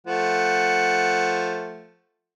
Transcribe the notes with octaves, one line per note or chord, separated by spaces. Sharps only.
F3 A3 F#5